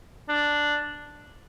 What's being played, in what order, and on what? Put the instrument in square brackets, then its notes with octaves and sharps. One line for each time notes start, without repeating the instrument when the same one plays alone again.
[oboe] D4